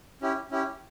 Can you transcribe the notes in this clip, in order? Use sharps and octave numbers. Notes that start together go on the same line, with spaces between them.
C#4 E4 G4
C#4 E4 G4